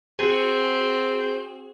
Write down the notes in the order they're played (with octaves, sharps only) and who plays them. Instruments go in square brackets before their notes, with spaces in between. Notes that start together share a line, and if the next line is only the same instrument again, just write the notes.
[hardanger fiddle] C4 [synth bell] F#4 G#4